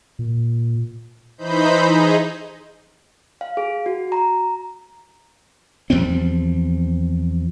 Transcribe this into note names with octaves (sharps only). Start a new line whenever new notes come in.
A#2
E3 D#4 C5 B5 G6
D#4 G#4
F5
G#4
F#4
A#5
E2 F3 G3 C4